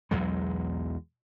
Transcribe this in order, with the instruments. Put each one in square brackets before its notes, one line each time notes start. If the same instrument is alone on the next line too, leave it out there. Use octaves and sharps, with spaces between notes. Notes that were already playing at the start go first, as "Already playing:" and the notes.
[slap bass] B1 E2 F#3 G#3